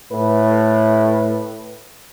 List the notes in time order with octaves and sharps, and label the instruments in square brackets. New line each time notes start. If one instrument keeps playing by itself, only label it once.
[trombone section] A2 B4